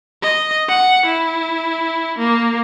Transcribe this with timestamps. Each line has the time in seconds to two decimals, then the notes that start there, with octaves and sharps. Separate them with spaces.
0.22 D#5
0.69 F#5
1.06 E4
2.19 A#3